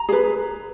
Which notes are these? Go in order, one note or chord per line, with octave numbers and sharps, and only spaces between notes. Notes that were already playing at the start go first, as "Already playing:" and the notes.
Already playing: A#5
G#4 B4